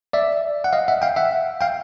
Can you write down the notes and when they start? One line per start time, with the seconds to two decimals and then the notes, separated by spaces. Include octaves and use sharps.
0.13 D5 E5
0.64 F#5
0.73 D#5 F5
0.88 E5 F#5
1.02 F5 G5
1.16 E5 F#5
1.61 F5 G5